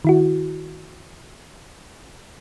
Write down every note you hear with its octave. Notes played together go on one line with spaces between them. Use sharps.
D#3 E4 F#4